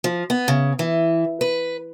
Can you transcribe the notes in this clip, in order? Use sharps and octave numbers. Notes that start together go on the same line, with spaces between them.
F3
B3
C#3
E3
B4